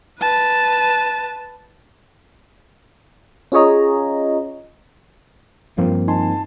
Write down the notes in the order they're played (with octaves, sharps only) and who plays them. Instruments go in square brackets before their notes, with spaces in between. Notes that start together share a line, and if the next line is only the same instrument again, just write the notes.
[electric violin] B4 A5
[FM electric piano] C#4 F4 G#4 C#5 D#5 A#5
[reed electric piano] G2 A#3 C4 [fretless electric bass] F3
[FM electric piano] D#4 G#5 C6 [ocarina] A5